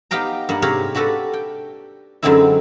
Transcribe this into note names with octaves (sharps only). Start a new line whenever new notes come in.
B3 D#4 G4 F5 G5 A#5
G2 A#3 F#5
G#2 C3 G4 A#4 C#5 F5
D4 F#4 G4 A4 B4
G5
F#2 D3 G#3 C4 D#4 E4